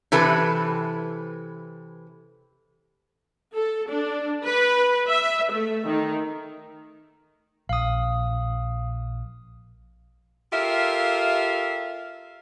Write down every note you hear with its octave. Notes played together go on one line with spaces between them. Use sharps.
C3 E3 A4 B4
A4
D4
B4
E5
A3
D#3
A#1 F5 D#6
F4 G4 A4 A#4 E5 F5